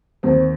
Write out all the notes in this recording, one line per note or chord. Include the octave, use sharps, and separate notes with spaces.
D#2 D#3 C4